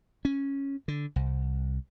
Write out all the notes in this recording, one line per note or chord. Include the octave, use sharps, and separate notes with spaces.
C#4
D3
C2